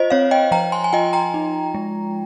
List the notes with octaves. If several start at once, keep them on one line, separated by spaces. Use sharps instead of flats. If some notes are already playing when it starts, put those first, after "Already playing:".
Already playing: F4 C5 D#5
C4 C#5 F5
D#5 G5
F3 G5 A#5
G#5 C6
G#5
F4 D#5 G5
G5 A#5
D#4
G#3